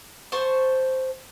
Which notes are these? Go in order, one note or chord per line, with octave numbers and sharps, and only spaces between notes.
C5 A5 C#6